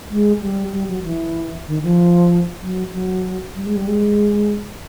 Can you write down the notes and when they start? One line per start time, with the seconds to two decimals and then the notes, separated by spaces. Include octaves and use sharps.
0.11 G#3
0.42 G3
0.73 G3
0.88 F#3
1.04 E3
1.68 D#3
1.83 F3
2.62 F#3
2.93 F#3
3.56 G3
3.66 G#3
3.76 G3
3.87 G#3